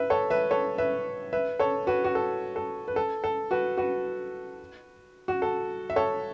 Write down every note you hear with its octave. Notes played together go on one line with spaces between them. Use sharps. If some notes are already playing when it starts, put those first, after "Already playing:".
Already playing: B4 E5
A4 C#5
B4 E5
A4 C#5
B4 E5
B4 E5
A4 C#5
F#4 B4
F#4
A4
A4
B4
A4
A4
F#4 B4
F#4 B4
F#4
A4
E5
A4 C#5